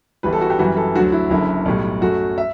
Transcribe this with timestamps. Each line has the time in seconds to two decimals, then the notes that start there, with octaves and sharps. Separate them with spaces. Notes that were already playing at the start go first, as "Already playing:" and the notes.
0.23 G1 G2 E3 G3 B4
0.33 A4
0.41 F#4
0.50 G4
0.59 F#2 E3 G3 F#4
0.77 A4
0.95 D2 D3 F#3 F#4
1.12 E4
1.30 F#1 F#2 D3 E4
1.65 B1 A2 G3
2.01 F#2 F#3 A3 F#4
2.38 E5